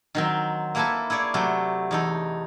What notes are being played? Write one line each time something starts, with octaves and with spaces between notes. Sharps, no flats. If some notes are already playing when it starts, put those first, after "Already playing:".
D#3 F#3 C4
A#3 E4 A4 B4 G#5 A5
E4 G#4 C#5 D5
C3 F#3 A3
E2 D#4 A4